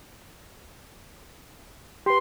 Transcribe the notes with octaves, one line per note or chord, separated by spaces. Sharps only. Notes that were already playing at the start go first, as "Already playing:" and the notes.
G4 B4 C6